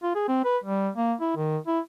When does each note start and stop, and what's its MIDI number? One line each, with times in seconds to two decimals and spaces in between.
0.03 0.12 65
0.15 0.24 68
0.28 0.40 60
0.44 0.57 71
0.64 0.89 55
0.96 1.13 58
1.20 1.33 64
1.36 1.58 51
1.67 1.80 64